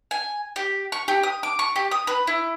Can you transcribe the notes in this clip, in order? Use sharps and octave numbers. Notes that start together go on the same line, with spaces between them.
G#5
G4
C#6
G4
D#6
D6
C#6
G4
D#6
B4
E4